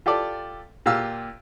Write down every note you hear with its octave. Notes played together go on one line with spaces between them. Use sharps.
F4 G4 A4 D5
A#2 F4 G4 F5 E6